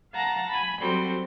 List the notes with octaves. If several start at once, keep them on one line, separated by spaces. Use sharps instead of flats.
F5 F#5 A5 A#5 A#6
G#5 B5
F#3 G3 C4 F#4 A4 C5